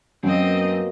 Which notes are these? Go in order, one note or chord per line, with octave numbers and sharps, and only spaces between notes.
F#2 B2 A#3 C4 D#5